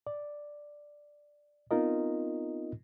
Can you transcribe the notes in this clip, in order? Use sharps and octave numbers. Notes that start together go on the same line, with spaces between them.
D5
B3 C4 D#4 F4 A#4 D#5